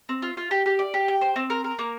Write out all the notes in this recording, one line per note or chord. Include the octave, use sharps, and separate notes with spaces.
C4
F4
F4
G4
G4
D5
G4
G5
C5
C4
A#4
A#4
A#3